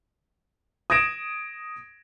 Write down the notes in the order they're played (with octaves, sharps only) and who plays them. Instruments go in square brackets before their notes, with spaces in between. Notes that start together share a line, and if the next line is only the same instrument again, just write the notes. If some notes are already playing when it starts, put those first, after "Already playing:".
[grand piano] D#6 G#6 A#6 D7 E7